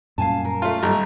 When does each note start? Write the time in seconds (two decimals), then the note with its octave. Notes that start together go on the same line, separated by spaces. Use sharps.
0.18 F#2 A#2 G3 F5 G#5 A5
0.45 A#4
0.62 A3 C#4 F4
0.83 G#1 G3 A3 C#4 G4 A#5